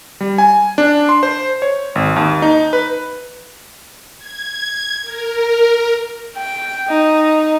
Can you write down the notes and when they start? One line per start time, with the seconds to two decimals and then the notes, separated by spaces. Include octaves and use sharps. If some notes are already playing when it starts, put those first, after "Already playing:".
0.21 G3
0.38 G#5
0.78 D4
1.09 C6
1.23 C5
1.62 C#5
1.95 G#1
2.16 D#2
2.42 D#4
2.73 B4
4.17 G#6
5.02 A#4
6.37 G5
6.89 D#4